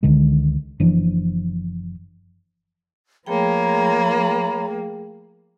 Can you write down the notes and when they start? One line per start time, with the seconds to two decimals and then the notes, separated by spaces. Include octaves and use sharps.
0.03 C#2 D3 D#3 G#3
0.80 F#1 E3 F3 D4
3.26 F3 A3 A#3 G#4 C#5 G5 A#5 B5